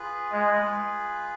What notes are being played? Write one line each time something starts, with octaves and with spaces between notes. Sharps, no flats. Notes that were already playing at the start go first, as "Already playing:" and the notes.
Already playing: F4 G#4 B4
G#3